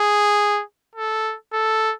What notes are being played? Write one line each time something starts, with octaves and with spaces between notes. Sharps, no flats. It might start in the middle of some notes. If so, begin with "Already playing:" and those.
Already playing: G#4
A4
A4